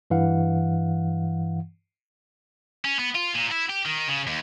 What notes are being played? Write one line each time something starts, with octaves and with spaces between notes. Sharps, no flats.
G2 E3 F5 F#5
C#4
B3
F4
A#2
E4
G4
D#3
C#3
D#2